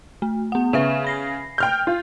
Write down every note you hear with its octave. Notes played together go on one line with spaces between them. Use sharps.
A3
B3 F#5
C#3 B4 E5 E7
B5 A#6 C7
G5 F6 G6
F4